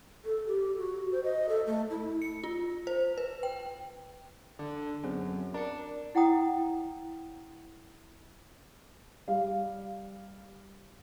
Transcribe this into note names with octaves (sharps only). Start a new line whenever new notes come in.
A4
G4
F#4
C5
D#5
A4
A3
E4
C#7
F4
C5
B4
G5
D3
F#2 B3 C4 G#4
D4 A#4 C#7
E4 F#5 G5 A#5 D#6
G3 F5